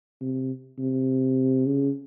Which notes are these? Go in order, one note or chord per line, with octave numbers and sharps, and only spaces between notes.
C3
C3
C#3